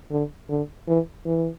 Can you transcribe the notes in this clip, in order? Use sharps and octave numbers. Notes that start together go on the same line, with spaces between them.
D3
D3
E3
E3